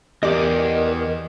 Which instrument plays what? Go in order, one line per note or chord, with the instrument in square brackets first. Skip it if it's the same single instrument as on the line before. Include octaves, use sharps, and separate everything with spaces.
[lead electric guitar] E2 [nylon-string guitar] G4 D5 [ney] A#4 [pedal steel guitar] D#5 D6 D#6